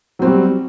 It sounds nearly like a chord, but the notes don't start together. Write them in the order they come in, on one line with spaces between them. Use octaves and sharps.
F#3 C4 F#4 G3